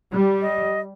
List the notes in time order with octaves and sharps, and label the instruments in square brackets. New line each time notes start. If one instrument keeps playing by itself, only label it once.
[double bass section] G3
[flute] D#5